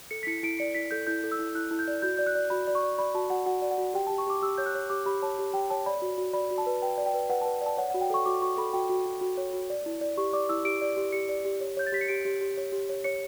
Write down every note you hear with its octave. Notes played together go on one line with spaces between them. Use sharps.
A4 C#7
B6
E4 C#7
E4 D7
D5 C#7
E4 B6
A4 G6
E4 G6
A4
E6
E4
E4 F#6
E4
G6
D5
F#4 G6
D5 G6
F#6
D5
F#4 B5
D5
C#6
D5
D5 B5
F#4 A5
F#4 F#5
F#4 F#5
D5
F#5
F#4
G4 G5
A5
G4
C#6
G4 D6
G4 E6
C#5 G6
F#6
C#5
G4 D6
G4 B5
C#5 A5
G4
G4 G5
C#5 A5
D5 B5
F#4
F#4
D5 B5
F#4
A5
B4
B4 G5
D5
G5
B4
B4 F#5
A5
B4
D5 A5
C#5 F#5
F#5
F#4
G5
A4 C#6
F#4 D6
F#4 C#6
A4 B5
F#4 G5
F#4
F#4
F#4
C#5
F#4
D5
E4
D5
G4 C#6
D5 D6
E4 E6
G4 D7
D5
G4
G4 C#7
D5
G4
C#5
C#5 G6
A6
G4 B6
C#7
G4 D7
G4
G4
C#5
G4
C#5
C#5 C#7